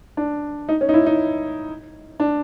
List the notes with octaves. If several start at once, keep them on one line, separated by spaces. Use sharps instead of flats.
D4
D#4
C#4
D#4
E4
D#4
D4